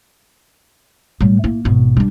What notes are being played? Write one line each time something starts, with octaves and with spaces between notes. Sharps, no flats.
A2 G3
A#3 E4
G#1 B2
G3 D4